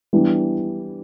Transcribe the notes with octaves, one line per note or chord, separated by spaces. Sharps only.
E3 G3 B3 D4